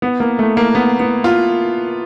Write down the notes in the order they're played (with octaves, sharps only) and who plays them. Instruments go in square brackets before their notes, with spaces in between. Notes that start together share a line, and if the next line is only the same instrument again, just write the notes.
[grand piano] B3
A#3
A3
A#3
B3
B3
F4